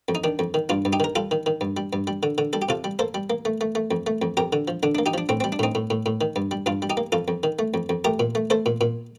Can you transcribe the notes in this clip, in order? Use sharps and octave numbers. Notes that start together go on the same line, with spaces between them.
F2
D#4
D#3 D4
F2
D#3
G2 D4 F4
G2
D#4 G4
D#3 A#4
G3 F4 A4
D#3
D#3
G2
G3
G2
G3
D3
D3
G3 A4
G4
C3 F4 A4
G3
A#3 A4 C5
G3
A#3
A3
A3
A3
F2
A3
F2
F2 G4 A#4
D3
F3
D3 D4
D4
A#3
D#4 G4
F3 D4
A2 C4
C4
G3
D4
A2 C4 D#4
A2
A2
A2
D#3
G2
G3
G2 D4 F4
G3
D#4 G4
A#3
F2 F4 A4
F2
D#3
A3
F2
F2
A3 G4 A#4
A#2
A3
A3 A4 C5
A#2
A#2